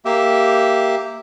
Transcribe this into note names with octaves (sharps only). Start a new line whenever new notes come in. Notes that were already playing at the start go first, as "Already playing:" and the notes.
A#3 G4 E5